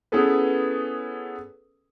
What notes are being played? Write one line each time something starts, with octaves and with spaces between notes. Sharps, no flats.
B3 C#4 E4 G#4 A4 B4